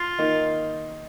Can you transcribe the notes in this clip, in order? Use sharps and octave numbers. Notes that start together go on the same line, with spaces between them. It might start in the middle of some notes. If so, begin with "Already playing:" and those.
Already playing: F4
D#3 A#3 D#4